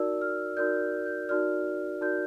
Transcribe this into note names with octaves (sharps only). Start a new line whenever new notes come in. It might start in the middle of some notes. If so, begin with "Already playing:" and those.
Already playing: D#4 F#4 A#4 D5 E6
F6
D#4 F#4 A#4 D5 G6
G6
D#4 F#4 A#4 D5 F6
D#4 F#4 A#4 D5 G6